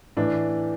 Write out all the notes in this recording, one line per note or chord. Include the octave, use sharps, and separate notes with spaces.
A2 E3 D4